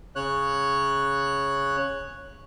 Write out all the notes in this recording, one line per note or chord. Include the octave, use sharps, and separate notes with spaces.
C#3 C#5 F#6